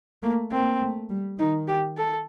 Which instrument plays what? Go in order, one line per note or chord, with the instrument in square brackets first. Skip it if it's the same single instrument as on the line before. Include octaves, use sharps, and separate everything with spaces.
[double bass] A3 [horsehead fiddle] A#3
[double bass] A#3 [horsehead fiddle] C4
[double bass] A3
G3
[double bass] D#3 [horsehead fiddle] D#4
[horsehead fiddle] G4
A4